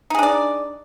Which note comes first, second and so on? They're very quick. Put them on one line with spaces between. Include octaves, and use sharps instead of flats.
D#4 G#4 D4 D5